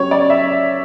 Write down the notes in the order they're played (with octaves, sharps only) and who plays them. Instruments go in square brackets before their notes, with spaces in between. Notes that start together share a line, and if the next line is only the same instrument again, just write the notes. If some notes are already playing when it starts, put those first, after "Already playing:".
Already playing: [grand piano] F#3 C#4 G4 [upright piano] C#5
[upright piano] D5
E5